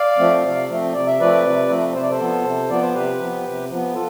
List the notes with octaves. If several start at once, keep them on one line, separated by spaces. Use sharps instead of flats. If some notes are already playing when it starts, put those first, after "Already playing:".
Already playing: D5 F5
F3 A3 C4
C3
F3 A3 C4
C3 D5
E5
F3 A3 C4 B4 D5
C3
F3 A3 C4
C3 C5
D5
A4 C5
F3 B3
C3
F3 B3 D5
C5
C3 G4 B4
F3 B3
C3
F3 B3
F4 A4